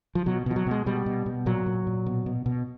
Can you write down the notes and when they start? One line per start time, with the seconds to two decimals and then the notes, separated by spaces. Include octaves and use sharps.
0.15 F3
0.26 B2 F#3
0.46 B2 F3
0.56 F#3
0.67 B2 G#3
0.86 B2 G3
1.06 B2
1.26 B2
1.46 A#2 F#3
1.66 A#2
1.87 A#2
2.06 B2
2.26 B2
2.46 B2